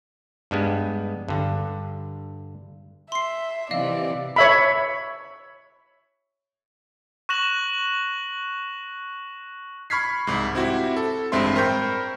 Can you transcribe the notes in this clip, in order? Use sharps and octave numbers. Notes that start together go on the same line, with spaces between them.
G2 G3 G#3 B3
G2 D3
E5 C6 C7
C3 E3 D5 D#5 F5
C#5 E5 B5
C#6 F#6 A#6 E7 F#7
B5 C#6 F6 G#6 B6 C7
C2 G#2
C4 E4 F#4 G4 E5
A4
A1 G2 G#3 C4 E5 C6
A#4 C5 G5 B5 C#6 G6